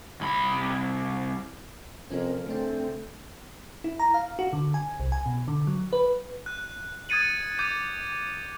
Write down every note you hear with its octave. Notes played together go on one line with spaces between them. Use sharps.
C2 B5
F2 C3 F3 C#4 A#4
C#3 A3 C4 D4
E4
A#5
F5
F#4
D3
G#5
C2
G#5
B2
D3
F#3
B4
F#6
D#6 G#6 A6 C#7 D#7 F#7
D6 G6 D#7